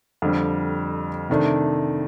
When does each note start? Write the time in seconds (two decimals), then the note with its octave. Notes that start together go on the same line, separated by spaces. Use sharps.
0.22 F2 D3 G3
1.30 C3 D#3 A3 D4